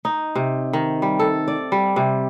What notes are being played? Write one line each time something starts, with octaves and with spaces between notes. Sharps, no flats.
D#4
C3
D#3
G3
A4
D5
G3
C3